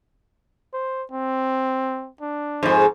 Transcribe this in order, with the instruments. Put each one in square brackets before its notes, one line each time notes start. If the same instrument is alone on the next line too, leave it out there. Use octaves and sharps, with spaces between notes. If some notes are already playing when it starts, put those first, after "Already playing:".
[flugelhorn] C5
C4
D4
[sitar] F2 G#2